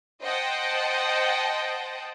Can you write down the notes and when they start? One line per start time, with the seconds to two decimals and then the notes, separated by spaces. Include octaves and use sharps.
0.22 C5 D#5 F#5 G5 A5